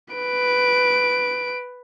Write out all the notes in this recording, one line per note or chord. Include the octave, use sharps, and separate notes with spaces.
B4 D7